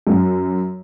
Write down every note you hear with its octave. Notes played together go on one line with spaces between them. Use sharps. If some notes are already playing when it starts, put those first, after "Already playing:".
F#2